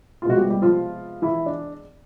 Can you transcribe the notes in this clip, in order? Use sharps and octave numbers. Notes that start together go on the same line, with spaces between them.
F4
C3 F3 G#3 B3 F#4
G3 G4
G3 G4
F3 F4
E3 E4
D4